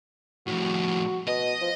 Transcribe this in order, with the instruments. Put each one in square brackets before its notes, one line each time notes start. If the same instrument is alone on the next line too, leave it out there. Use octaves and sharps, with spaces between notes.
[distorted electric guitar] F2 A2 [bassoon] F#4
[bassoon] B2 [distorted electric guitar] D#5
[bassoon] F3